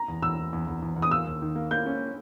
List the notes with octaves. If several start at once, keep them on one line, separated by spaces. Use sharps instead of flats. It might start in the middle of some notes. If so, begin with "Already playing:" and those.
Already playing: A#5
E2
E2 E6
E2
E2
E2
E2
E2
D#6
A#3 E6
D#2
D#3
A#3
A#3 G6
C#4